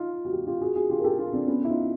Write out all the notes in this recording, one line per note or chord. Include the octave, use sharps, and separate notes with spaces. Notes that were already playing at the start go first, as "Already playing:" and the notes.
Already playing: D#4 F4
F#4
F4 G4
F4 G4
F#4 G#4
F#4 G#4
F4 G4
A#4
G4 A4
F4 G4
C4 D4
B3 C#4
E4
D#4 F4